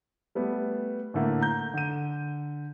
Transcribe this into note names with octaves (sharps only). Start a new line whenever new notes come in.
G3 A3 B3
A2 D3 A3 A#3
A#5 G6
D3 D#7